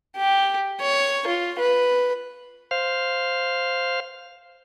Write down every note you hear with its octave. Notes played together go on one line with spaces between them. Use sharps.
G4
C#5
F4
B4
C5 F5